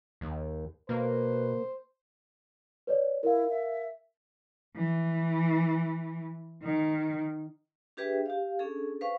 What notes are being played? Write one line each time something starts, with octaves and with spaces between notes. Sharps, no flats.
D#2
B2 A#3 B4 C5
B4 C#5 D5
E4 A#4 F5
E5
E3
D#3
D4 G4 G#4 B4 E5 G5
G4 F5
C#4 D4 G#4 A4
B4 C5 F5 C#6